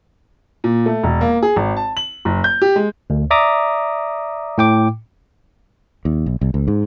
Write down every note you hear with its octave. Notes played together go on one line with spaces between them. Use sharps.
A#2
A3
E1
A#3
G#4
G#1
A5
F#7
F#1
G6
G4
G#3
D2
D5 E5 A#5 D6 D#6
A2 G5 D6
D#2
B1
C2
C#2
G#2